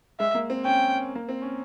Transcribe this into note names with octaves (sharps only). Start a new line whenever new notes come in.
G#3 E5
A#3
C4
C#4 G5
A#3
C4
C#4